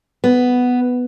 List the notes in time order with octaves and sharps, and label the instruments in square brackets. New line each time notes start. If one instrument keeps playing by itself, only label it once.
[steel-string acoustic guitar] B3